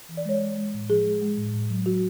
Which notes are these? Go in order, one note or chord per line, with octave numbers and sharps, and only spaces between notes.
E3
D5
G#3 C#5
G#3
G#3
A2
F3 G#4
G#3
G#3
A2
A2
F#3
F#3 F#4